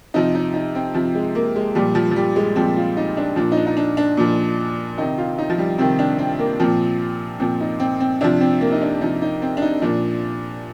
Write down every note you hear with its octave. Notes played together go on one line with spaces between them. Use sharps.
C3 F3 D#4
D#4
D#4
C4
C3 F3
G#3
A#3
G#3
A#2 F3 G3
F3
F3
G3
G#3
A#2 F3 C4
F4
D#4
D4
A#2 F3 D4
D#4
D4
D#4
D4
D4
A#2 F3
C3 D#3 D#4
F4
D#4
F3
G3
C3 D#3 C4
D4
C4
A#3
A#2 F3 C4
A#2 F3 C4
D#4
C4
C4
C3 F3 D4
C4
A#3
D#4
D4
C3 F3 D#4
D#4
C4
D4
D#4
A#2 F3 D4